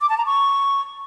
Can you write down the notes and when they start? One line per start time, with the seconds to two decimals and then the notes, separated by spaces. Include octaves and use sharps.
0.01 D6
0.10 A5
0.18 A#5
0.26 C#6